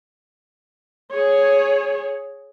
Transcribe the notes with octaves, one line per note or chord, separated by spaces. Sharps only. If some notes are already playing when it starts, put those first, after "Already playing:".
G#4 C#5